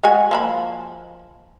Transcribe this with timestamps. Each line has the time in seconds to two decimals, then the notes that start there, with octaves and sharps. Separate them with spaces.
0.03 G#3 F#4 G#5
0.31 F3 A#3 B5